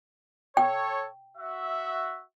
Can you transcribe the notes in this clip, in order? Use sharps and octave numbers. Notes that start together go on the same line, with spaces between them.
A4 C#5 G5
F#4 E5